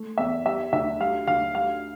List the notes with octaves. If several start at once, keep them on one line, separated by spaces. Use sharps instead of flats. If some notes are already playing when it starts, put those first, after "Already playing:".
Already playing: A3
E2 E5
G3 E5
D2 E5
G3 F5
D2 F5
G3 F5